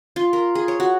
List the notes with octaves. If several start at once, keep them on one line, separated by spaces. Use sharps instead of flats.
F4
A#4
G#4
C#5
F#4